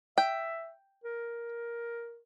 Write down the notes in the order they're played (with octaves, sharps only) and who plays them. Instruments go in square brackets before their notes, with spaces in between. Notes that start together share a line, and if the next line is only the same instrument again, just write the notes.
[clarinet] E5 [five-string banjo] G5
[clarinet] A#4